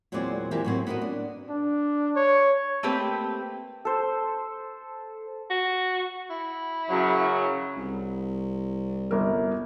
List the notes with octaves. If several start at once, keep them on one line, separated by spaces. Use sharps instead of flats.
E2 A#2 F#3 G#3 C4 D5
E3 F3 G4 A#4
A2 F#3 C4
B3 C4 F#4 A#4 D#5
D4
D4
C#5
A3 A#3 C4 G4 B4
A4 C5
F#4
E4
F#2 C#3 F#3
C2
G1 A#4